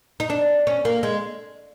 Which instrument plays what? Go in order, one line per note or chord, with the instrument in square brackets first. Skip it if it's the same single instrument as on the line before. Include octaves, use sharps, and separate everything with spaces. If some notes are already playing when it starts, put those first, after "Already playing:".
[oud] D#4
D4
C#4
A#3
G#3